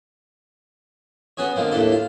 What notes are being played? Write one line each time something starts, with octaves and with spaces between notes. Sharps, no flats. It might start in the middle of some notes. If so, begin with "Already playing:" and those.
B3 C#4 F#4 G#4 C#5
D3 D#3 F3 A#3 C4
D#2 A2 D4 G4 A4
F4